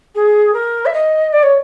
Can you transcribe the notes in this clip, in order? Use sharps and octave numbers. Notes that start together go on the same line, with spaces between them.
G#4
A#4
E5
D#5
D5
C#5